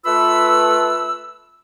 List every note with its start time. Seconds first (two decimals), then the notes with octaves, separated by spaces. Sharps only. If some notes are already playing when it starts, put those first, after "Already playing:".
0.04 A3 F4 B4 B5 E6